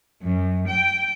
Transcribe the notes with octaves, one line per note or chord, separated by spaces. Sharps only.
F#2
G5